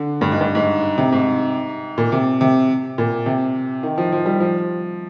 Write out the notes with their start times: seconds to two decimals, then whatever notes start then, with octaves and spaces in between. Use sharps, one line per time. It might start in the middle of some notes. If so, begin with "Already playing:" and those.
Already playing: D3
0.21 G2
0.32 G#2
0.41 G2
0.55 G#2
0.98 C3
1.13 G#2
1.98 A#2
2.12 C3
2.41 C3
2.98 A#2
3.26 C3
3.83 D#3
3.98 F3
4.12 F3
4.26 G3
4.40 F3